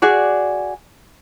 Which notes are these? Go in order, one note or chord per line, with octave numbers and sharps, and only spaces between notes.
F#4 G#4 D5